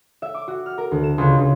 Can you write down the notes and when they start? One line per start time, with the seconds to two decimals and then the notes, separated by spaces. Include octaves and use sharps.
0.22 E5
0.34 D6
0.48 F#4
0.66 F6
0.78 A#4
0.91 D2
1.04 E7
1.18 C#2
1.40 C#2